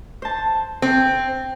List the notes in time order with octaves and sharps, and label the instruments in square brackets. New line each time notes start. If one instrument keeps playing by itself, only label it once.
[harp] C5 A5
[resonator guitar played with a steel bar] C4